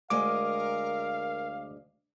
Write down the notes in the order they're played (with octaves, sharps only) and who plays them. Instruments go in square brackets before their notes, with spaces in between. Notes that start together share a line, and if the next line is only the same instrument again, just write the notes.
[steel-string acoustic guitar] D2 G#3 G#5 [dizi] A#4 [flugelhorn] F5 [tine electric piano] D6